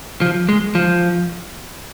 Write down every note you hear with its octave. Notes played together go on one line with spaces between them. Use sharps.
F3
G#3
F3